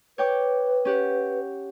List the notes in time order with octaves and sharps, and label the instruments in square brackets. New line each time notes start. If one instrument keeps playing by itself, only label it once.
[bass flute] B4 [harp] C#5 G5 D6
[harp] C#4 G4 F#5